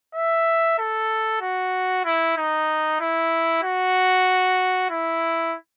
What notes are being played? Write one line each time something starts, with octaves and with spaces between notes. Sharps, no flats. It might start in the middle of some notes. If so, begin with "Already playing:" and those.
E5
A4
F#4
E4
D#4
E4
F#4
E4